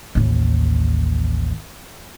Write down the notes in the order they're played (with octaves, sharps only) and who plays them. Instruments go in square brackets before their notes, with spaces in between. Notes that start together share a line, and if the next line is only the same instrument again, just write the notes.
[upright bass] A1 D#2